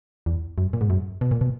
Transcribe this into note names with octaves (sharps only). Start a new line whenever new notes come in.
E2
F#2
A#2
G#2
F#2
B2
A#2
B2